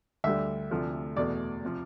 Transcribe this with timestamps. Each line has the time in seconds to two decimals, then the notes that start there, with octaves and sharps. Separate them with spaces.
0.24 D2 D3 G3 E5
0.71 D2 C3 F3 A3
1.16 E2 B2 A3 D5
1.64 C3 F3